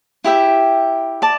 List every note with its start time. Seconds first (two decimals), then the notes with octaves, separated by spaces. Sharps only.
0.24 E4 G4 E5 G5
1.22 D5 A5